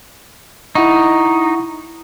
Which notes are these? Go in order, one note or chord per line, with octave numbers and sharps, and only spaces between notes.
D#4 E4 F#5 C#6